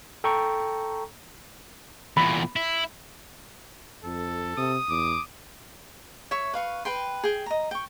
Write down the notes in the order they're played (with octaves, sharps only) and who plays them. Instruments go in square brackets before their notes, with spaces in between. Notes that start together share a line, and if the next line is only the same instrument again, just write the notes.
[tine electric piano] A4 G5 A#5 C#6
[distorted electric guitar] E2 A#2 [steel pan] B5
[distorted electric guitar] E4
[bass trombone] F2 [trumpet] A4
[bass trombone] C3 [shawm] D#6
[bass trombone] E2 [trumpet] D6
[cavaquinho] C#5 E5 C#6
B4 F5 C#6
B4 G5 C6
G#4 G5
D#5 A#5
G5 C#6